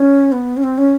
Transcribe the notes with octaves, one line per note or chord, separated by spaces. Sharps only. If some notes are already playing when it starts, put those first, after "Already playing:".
Already playing: C#4
B3
C#4
C4
C#4